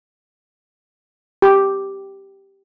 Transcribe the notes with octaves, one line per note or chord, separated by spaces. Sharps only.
G4